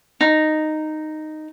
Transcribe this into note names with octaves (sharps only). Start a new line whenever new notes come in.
D#4